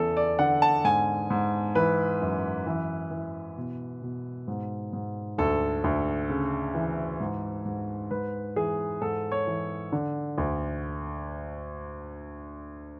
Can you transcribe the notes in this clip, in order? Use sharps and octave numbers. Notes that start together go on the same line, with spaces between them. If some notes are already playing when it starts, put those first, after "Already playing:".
Already playing: E2 C#3 A4
D5
D3 F#5
A5
G#2 G#5
G#2
E3 B4
F#2
E3
E3
B2
B2
G#2
G#2
D2 A4
D2
C#3
E3
G#2
G#2
G#2 B4
E3 G#4
G#2 A4
C#5
E3
D3
D2